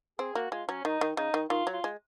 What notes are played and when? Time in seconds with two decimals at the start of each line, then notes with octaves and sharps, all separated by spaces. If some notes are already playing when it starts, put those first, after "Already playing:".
0.19 C4 G#4
0.35 A#3 F#4
0.52 G#3 F4
0.69 F#3 C#4
0.85 D#3 D#4
1.01 D#3
1.17 C#3 D#4
1.34 D#3
1.50 D#3 F4
1.67 F#3
1.73 F4
1.84 G#3